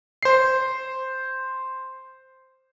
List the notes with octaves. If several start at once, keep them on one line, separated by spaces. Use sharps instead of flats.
C5 C7